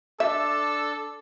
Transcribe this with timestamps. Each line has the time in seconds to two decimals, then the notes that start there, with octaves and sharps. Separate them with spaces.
0.20 D4 A4 E5 A5 E6